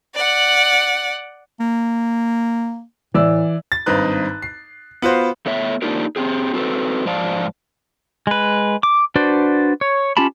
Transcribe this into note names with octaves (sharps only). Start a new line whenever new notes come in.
D5 F#5
A#3
A2 E3 D5 E6
A6
G#1 G2 C4 D#4 B4 F#6
C7
B3 F4 F#4 C5
A3 B3 C#5 E5
A#3 D4 D#4 F4 G4 A#4
C4 G4 G#4
C4 F#4 A4 B4
G#2 F3 C5 D5 F5 A5
G#3 B4
D6
D4 F#4 B4 C5 D5
C#5
C#4 F4 G4 A5 B5